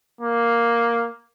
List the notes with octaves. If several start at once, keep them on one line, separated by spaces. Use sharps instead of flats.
A#3